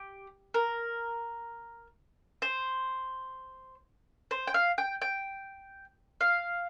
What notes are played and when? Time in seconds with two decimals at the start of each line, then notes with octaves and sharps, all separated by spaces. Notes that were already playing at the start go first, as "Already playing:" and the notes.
Already playing: G4
0.54 A#4
2.42 C5
4.31 C5
4.47 G5
4.54 F5
4.78 G5
5.02 G5
6.21 F5